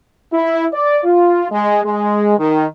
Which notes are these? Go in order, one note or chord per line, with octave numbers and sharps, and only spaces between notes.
E4
D5
F4
G#3
G#3
D#3